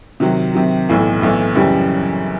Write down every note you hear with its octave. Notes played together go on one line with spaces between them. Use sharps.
C3 D#3 F#3
C3 D#3 F#3
B1 A2 E3
B1 A2 E3
F#2 C#3 E3 G3